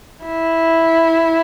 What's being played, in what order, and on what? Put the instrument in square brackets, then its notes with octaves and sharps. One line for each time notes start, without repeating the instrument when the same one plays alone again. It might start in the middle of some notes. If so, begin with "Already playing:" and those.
[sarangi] E4